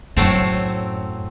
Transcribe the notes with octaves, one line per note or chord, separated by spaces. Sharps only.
F#2 A2 F#3 A3 C4